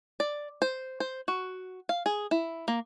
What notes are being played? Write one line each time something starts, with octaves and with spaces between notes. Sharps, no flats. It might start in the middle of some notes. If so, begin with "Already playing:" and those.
D5
C5
C5
F#4
F5
G#4
E4
A#3